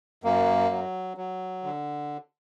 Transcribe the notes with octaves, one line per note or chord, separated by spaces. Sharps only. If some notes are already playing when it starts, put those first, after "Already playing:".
F#2 A#3
F#3
F#3
D3